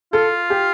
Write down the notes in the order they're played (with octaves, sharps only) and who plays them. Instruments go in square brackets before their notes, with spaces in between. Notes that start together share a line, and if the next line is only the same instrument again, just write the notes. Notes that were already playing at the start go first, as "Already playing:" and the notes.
[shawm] F4 [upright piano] A4
[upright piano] G4